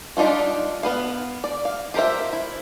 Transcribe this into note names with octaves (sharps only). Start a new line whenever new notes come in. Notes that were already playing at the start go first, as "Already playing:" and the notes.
G3 D4 D#4 F4 F#4
B3 B4 F5
D5
F5
F4 G4 A#4 C5 E5
E4